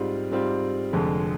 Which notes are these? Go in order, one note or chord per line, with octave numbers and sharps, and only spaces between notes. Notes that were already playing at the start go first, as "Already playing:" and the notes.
Already playing: G#2 G3 C4 F4
G#2 G3 C4 F4
F1 F2 D3 F3 G#3